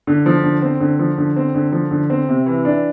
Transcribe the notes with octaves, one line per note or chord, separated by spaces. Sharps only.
D3
F3
D3
C4
D3
F3
D3
C4
D3
F3
D3
C4
C3
E3
D4